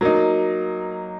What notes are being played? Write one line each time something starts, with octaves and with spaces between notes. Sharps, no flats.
F#3 A#3 D#4